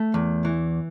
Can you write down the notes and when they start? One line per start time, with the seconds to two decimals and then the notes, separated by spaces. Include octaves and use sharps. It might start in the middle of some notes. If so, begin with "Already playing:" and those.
Already playing: A3
0.14 E2
0.45 E3